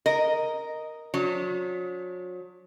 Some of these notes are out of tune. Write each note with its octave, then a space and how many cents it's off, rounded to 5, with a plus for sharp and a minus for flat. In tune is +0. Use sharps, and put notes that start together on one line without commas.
A#4 +0 D#5 +0
F#3 -40 D4 -40